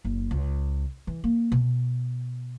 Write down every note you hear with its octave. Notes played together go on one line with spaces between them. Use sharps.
F#1
C#2
E3
A#3
B2